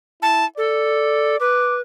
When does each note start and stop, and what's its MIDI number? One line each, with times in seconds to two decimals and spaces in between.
0.22 0.46 64
0.22 0.45 81
0.58 1.36 69
0.58 1.38 74
1.40 1.81 71
1.40 1.76 86